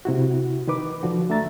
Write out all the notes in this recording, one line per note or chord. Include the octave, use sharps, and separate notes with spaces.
C3 E4 F#4
D#3 D#4 B4 D6
D3 F3 F#4
A3 D4 E5 A#5 A6